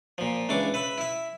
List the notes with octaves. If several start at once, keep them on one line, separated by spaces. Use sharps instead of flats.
A#2 F3
C#2 E3 D4 C#6 D6
B4 E5 B5
E4 E5